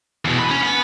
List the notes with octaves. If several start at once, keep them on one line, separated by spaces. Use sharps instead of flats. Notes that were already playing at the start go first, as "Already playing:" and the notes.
E2 B2
B4
C#4
F#5 B5